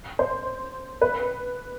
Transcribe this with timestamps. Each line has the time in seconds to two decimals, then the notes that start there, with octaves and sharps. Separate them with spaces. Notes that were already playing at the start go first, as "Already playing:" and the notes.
0.19 C5
1.01 B4